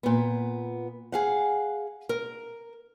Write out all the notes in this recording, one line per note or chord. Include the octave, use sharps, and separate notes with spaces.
A#2 B3
G#4 F5 F#5
A#4